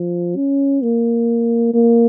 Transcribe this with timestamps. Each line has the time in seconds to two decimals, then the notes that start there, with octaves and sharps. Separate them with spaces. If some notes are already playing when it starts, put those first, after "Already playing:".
Already playing: F3
0.36 C#4
0.83 A#3
1.74 A#3